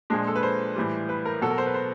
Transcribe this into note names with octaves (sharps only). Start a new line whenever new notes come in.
A#2 F3 G#3 D4
A4
B4
C5
A2 E3 G3
B4
A#4
B2 F#3 A4
A#4
C5
B4
C5